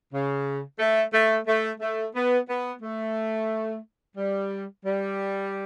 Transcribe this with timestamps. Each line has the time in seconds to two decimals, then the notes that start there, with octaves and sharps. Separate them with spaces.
0.12 C#3
0.79 A3
1.13 A3
1.46 A3
1.80 A3
2.14 B3
2.48 B3
2.81 A3
4.15 G3
4.83 G3